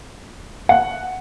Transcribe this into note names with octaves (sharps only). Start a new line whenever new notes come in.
F#5